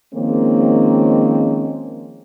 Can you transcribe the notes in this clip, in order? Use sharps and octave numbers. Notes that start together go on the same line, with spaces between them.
D#3 F3 G#3 A#3 C4 C#4